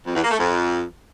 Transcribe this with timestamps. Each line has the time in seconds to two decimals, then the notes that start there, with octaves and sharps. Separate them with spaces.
0.06 F2
0.14 E2
0.23 A#3
0.31 A3
0.39 F2